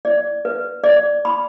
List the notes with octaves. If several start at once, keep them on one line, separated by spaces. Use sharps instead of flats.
D5
B4
D5
B5